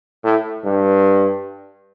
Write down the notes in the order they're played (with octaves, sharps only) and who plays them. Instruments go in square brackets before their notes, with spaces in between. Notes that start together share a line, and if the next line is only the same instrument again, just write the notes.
[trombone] A2
G2